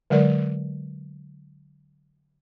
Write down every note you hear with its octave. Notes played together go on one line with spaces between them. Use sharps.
D3 F#3 G#3 A#4 D5